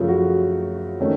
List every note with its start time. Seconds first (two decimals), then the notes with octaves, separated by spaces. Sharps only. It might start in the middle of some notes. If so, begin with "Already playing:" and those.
Already playing: F#2 C#3 F3 A3
0.08 F#4
0.99 D#3 A3 C#4